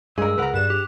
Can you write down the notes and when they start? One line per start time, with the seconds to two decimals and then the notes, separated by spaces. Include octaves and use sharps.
0.18 G2 G#3 G#4 A#4 E6
0.38 C#2 A#4 B4 F#5 A#5
0.54 G2 G3 F#6 E7
0.70 G4